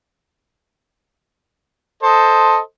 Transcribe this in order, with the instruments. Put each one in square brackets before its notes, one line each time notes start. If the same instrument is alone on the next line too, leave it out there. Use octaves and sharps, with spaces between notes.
[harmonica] A4 C5 D#5